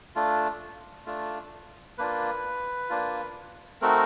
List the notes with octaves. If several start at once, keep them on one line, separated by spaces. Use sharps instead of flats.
A3 D4 F4
A3 D4 F4
A#3 D4 F4 B4
A#3 D4 F4
A3 C4 D#4 F#4 A#4